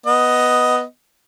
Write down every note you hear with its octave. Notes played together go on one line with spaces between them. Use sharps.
B3 D#5